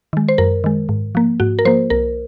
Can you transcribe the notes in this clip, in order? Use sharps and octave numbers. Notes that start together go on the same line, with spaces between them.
D#3 G#3
C5
F#2 A#4
D#3 G#3
G#2
F3 A#3
G#2 F#4
A#4
F3 A#3 C5
C2 A#4